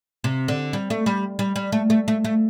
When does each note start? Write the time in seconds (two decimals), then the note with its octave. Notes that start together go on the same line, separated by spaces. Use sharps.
0.24 C3
0.48 D3
0.73 G3
0.90 A3
1.06 G3
1.39 G3
1.56 G3
1.72 A3
1.90 A3
2.08 A3
2.25 A3